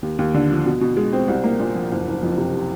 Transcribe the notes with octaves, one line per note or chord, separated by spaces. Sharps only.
D#2
D#2
D3
F3
B2
B2
G#3
C4
C2
A#3
A#2
F3
F#1
F#1
F2
C3